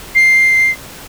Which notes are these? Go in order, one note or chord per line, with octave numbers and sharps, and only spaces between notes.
C7